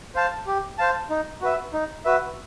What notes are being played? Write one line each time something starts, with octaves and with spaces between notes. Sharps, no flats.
C5 F5 A5
G4
C5 F5 A5
D#4
F#4 B4 E5
D#4
F#4 B4 E5